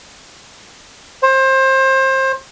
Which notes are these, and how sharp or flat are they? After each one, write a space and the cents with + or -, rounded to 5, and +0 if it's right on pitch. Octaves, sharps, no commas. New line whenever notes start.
C5 +25